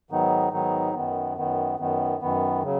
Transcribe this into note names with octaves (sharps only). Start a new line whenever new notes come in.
G#2 D#3 F#3 B3 D#4
G#2 D#3 F#3 B3 D#4
F#2 D#3 B3
F#2 D#3 B3
F#2 D#3 B3
F#2 D#3 B3
C#3 F#3